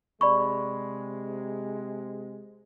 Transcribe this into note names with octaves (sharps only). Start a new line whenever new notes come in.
C3 G#3 D5 B5 C#6